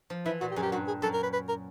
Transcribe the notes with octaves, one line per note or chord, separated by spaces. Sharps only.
F3
E3 E4
A#2 F#4
G4
F#2 G#4
G4
G2 F#4
G#4
F#2 A4
A#4
B4
B4
A#4